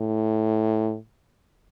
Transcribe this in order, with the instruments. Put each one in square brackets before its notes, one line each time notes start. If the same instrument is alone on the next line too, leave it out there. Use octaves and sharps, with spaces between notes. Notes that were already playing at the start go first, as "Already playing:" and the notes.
Already playing: [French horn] A2